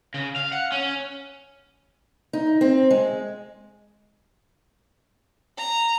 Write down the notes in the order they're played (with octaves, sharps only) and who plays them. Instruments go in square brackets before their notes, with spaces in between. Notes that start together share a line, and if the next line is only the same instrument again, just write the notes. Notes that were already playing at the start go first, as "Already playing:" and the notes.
[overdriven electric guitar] C#3
F5
F#5
C#4
[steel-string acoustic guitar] D#4
C4
G#3
[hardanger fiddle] A#5